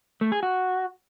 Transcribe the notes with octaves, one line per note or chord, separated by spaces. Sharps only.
A3
G#4
F#4